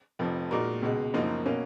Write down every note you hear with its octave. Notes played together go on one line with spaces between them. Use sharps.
F1 F2 F3
A#2 G#3 D#4 F#4 A#4
C#2 B2 G#3
F#1 F#2 F3 A#3 D#4
B2 A#3 C#4